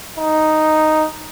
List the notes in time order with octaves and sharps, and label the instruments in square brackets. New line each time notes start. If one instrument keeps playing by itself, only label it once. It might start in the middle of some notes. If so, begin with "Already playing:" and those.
[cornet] D#4